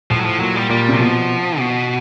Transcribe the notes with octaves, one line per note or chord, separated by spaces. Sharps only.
A2 F3
F#3
F3
A#2 F#3
G3
A#2 G3
C3 F#3
B2 F3
B2